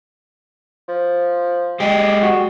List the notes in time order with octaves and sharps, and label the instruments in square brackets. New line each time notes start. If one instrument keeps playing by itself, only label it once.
[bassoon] F3
[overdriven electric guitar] G#3 G4
[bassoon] F#4